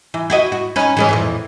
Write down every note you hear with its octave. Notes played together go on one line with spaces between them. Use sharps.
E3
E4 F#4 D#5
F#4
C#4 D#4 B4
E3 G#3 C#4
F2 A#2 E3